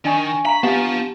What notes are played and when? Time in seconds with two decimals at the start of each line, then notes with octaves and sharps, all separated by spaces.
0.05 D#3 D4 G#5 C#6
0.45 F5 A#5 B5
0.63 B3 F4 G4 F5 F#5 A5